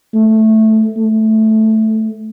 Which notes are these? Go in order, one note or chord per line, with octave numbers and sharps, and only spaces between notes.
A3
A3